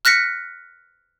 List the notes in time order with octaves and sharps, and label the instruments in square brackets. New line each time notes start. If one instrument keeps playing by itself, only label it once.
[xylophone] F6 F#6 A#6 B6 C#7